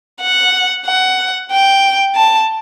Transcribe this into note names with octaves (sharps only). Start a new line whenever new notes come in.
F#5
F#5
G5
A5